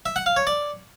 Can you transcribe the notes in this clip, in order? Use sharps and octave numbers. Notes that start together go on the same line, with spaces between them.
E5
F#5
F5
C#5
D5